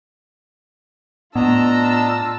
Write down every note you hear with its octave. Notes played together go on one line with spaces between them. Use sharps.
A2 B3 D4 F4 D#5 A5 A#5 E6